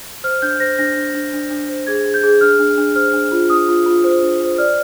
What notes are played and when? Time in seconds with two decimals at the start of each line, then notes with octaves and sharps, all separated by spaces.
0.24 C5 F6
0.42 D4 G6
0.60 C5 A#6
0.79 D4 A#6
0.97 D4
1.15 D4
1.33 D4
1.51 D4
1.69 C5
1.87 G#4 G#6
2.05 G#4
2.14 G6
2.23 G#4
2.41 D4 F6
2.59 D4
2.78 D4
2.95 C5 F6
3.14 D4
3.32 F4
3.50 D4 D#6
3.68 F4
3.86 F4
4.04 C5
4.22 D4
4.40 C5
4.58 D5 F6